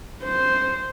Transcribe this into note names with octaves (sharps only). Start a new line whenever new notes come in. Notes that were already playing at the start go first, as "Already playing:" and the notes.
C5